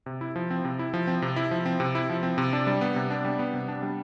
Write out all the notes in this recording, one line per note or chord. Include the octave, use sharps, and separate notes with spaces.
C3
E4
F3
C4
C3
E4
F3
C4
C3
E4
F3
C4
C3
E4
F3
C4
C3
D4
G3
B3
C3
D4
G3
B3
C3
D4
G3